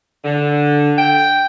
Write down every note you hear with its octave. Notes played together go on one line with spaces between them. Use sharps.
D3
G5